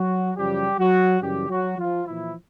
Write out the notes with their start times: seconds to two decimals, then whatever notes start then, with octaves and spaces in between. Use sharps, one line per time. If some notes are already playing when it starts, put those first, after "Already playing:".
Already playing: F#3 F#4
0.36 F#2 C#3 F3 G3 G4
0.79 F#3 F#4
1.21 F#2 C#3 E3 G3 G4
1.50 F#3 F#4
1.78 F3 F4
2.07 A#2 E3 F3 E4